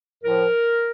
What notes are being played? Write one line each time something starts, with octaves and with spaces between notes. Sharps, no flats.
A2 F3 A#4